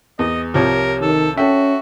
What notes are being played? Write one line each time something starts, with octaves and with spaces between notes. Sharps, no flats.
E2 D#5
C2 F3 G4 A#4 C#5
D#3 A4
C#4 F#4 A4 E5 G5